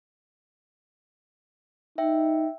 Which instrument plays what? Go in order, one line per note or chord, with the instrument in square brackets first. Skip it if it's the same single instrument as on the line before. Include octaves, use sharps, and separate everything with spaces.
[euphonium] D#4 [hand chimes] E5 G5